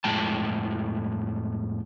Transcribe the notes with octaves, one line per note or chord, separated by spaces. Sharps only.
F2 A2 G#3 G5 A5